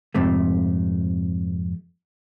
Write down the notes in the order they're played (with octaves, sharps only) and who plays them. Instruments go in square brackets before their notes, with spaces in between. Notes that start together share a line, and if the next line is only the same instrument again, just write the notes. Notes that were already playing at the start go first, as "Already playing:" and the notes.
[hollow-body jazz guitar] F2 G#2 C3 A3